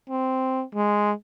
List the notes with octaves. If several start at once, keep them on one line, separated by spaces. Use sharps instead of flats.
C4
G#3